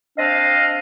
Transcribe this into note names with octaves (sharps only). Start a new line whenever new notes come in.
C4 D4 D#5 F5